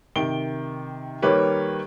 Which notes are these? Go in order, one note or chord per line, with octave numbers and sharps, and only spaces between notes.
C3 D#3 D7 G7
D#3 G3 A#3 B4 C#5